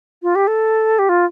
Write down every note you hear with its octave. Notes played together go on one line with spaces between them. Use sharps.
F4
G4
A4
G4
F4